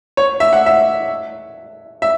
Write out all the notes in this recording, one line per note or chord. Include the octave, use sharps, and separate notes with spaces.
C#5
E5
F#5
E5
E5